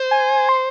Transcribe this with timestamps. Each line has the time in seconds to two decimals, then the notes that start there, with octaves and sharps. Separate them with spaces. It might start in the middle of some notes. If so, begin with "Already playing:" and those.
Already playing: C5
0.11 G#5
0.49 C6